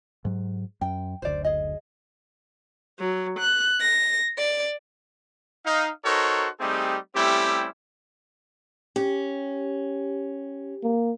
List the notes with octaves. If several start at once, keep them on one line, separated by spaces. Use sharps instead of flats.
G#2 F#3
F#2 G5
F#1 D2 C5 D5
G#4 D#5
F#3
F#6
A#6
D5
D#4 F5
D#4 F#4 A4 A#4 C5 C#5
G3 A3 C4 D#4 G4 G#4
G3 A3 C4 C#4 E4 G4
C#4 G4
A#3